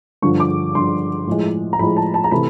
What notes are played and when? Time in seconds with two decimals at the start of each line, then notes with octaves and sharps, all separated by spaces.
0.22 G2 D3 F3 C#6
0.40 D6
0.75 G2 D3 F3 C6
1.27 A2 F3 G#3
1.73 A#5
1.79 A2 F3 G#3 B5
1.97 A5
2.14 A5
2.24 A#5
2.31 C3 E3 A3 B5